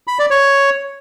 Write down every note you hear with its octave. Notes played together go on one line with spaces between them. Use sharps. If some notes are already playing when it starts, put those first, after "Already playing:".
B5
D5
C#5